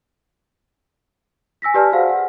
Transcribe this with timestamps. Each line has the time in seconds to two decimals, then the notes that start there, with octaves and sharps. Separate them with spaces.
1.62 G#5 E6 A#6 B6
1.74 G4 B4 D5 G#5 A5 F6
1.92 F#4 G#4 C5 F5 F#5
2.09 F#5